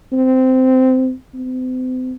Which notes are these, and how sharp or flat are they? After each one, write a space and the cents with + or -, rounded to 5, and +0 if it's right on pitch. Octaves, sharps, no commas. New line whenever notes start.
C4 -15
C4 -40